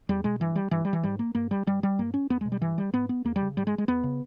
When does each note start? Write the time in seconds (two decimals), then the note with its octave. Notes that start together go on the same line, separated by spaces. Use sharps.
0.09 E2 G3
0.24 B2 G#3
0.40 G2 E3
0.56 G3
0.71 G2 E3
0.85 G3
0.93 E3
1.03 G#2 G3
1.19 A#3
1.35 G2 A#3
1.51 G3
1.67 G2 G3
1.83 G3
1.99 G2 A#3
2.14 C#4
2.30 E2 B3
2.41 B2 G#3
2.52 G3
2.61 G2 E3
2.78 G3
2.93 G#2 B3
3.09 B3
3.25 E2 A#3
3.36 G3
3.41 C#3
3.57 G#2 G3
3.67 G#3
3.78 G#3
3.88 E2 B3
4.03 C#3